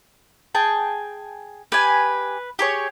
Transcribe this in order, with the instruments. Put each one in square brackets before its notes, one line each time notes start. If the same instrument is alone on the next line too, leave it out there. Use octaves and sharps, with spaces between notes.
[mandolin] G#4 G5 A5
[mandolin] G4 G#5 [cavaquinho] B4
[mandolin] G4 G#4 C#5